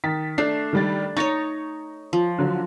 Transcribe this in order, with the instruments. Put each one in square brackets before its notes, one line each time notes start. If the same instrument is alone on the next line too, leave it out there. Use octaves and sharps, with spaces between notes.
[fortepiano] D#3 [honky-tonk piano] A6 B6
[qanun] A3 [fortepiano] D4 [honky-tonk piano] C7
[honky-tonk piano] D#3 G3 A6
[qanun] D#4 C#5 [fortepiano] C#6 [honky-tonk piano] A6 A#6 C#7
[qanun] F3
[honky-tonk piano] D3 F#3